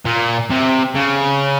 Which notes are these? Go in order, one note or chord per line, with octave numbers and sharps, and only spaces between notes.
A#2
C3
C#3